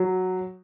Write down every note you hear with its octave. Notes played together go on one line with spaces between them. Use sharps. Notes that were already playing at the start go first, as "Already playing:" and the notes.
Already playing: F#3